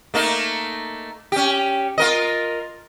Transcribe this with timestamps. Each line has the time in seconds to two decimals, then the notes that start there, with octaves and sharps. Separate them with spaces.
0.14 A3 A#3 D#4
1.32 C#4 G4
1.98 F4 A#4 D#5